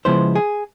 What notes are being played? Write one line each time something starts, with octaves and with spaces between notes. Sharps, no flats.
C#3 F3 G#3 B3 E4 C5
G#4